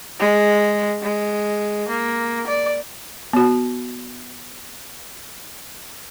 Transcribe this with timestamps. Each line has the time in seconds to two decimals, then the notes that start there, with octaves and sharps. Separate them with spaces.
0.20 G#3
1.02 G#3
1.89 A#3
2.47 D5
3.33 B3 F#4